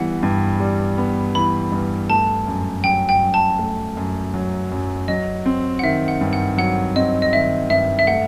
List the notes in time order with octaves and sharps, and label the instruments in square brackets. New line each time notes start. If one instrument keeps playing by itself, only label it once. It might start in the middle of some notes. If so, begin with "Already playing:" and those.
Already playing: [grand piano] E3 G3 B3 [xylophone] F#5
[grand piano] G2
G3
B3
[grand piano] E3 [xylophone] B5
[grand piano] G2
[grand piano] A3 [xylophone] A5
[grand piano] F#2
[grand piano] F#3 [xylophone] G5
[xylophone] G5
[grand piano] F#2
[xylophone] A5
[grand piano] A3
F#2
F#3
F#2
[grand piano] F#3 [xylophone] D#5
[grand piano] C4
[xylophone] F#5
[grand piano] D#3 [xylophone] E5
[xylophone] F#5
[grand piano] G2
[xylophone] F#5
[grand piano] F#3 [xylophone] F#5
[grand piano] C4 [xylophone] D#5
[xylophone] D#5
[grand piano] D#3 [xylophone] E5
[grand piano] G2 [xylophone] E5
[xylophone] E5
[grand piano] A3 [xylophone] F#5